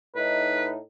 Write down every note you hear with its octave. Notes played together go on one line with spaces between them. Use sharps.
A2 D#4 B4